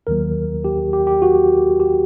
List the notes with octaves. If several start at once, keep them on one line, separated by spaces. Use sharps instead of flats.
D#2 D#3 F#3 A#3 A#4
G4
G4
G4
F#4
G4